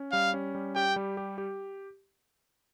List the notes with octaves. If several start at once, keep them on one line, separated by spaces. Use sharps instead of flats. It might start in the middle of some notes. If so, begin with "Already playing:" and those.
Already playing: C#4
G3 F5
C#4
G3
G4 G5
G3
G4
G4